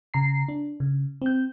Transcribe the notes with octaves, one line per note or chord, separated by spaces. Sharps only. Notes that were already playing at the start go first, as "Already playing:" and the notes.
C#3 A#5 C7
D4
C#3
C4 G6